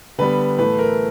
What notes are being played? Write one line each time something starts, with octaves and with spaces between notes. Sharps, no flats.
D3 G3 B3 B4
A2 E3 A3 B4
A#4